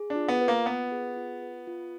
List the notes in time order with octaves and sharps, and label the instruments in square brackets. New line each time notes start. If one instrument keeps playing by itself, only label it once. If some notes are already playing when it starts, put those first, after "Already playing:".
Already playing: [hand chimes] G#4
[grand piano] D4
[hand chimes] F4
[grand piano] B3
[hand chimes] B4
[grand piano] A#3
[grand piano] B3 [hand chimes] F4
[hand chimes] G#4
F4
B4
F4